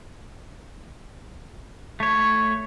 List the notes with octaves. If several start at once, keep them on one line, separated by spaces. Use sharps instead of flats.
A3 C#5